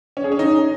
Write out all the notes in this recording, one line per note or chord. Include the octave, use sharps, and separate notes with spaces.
C#4
G#4
C#4
D#4